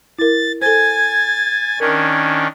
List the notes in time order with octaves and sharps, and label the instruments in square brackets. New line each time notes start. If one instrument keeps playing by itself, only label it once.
[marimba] E4 A#4 [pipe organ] A6
[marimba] A4 C5 [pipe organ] G#5 A6 [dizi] G#6
[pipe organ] D#3 C#4 D4 [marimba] A#4 [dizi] G#6